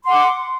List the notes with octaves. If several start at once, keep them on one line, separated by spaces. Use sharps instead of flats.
F#5 C6 D6